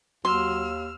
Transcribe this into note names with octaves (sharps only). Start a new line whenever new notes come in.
D#2 F#3 C6 E6 F6